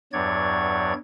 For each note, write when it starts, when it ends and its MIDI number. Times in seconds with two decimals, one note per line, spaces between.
0.13 0.93 40
0.13 0.93 43
0.13 0.93 54
0.13 0.93 73
0.13 0.93 74
0.13 0.93 92